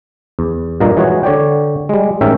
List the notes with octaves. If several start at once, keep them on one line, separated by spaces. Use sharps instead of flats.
E2
G2 A#2 A#3 D#5 A#5
E3 G#3 F#4 C#5 D#5
D3 C#5 D5 G5
G3 G#3
A1 G#2 C#4 A#4 E5 G5